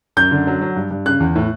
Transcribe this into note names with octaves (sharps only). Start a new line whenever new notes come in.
F#2 G6
D3
F#3
F#3
G2
G2
C#3 F#6
E2
A2